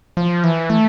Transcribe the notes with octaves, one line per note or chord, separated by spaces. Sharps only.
F3
E3
A3